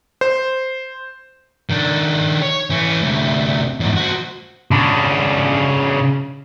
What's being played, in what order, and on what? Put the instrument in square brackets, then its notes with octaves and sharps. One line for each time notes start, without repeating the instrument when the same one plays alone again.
[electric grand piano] C5
[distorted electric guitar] D#3 D4
C#5
E3 C#4
D2 C3
E2 G#2
F#4 C5
C#3 D4